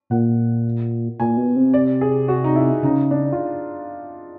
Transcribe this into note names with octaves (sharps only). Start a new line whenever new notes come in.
A#2 F#5
A#2 G#5
B2
C3
D5
G#4
F#4
D#4
E4
C#3 D#4
D4
F4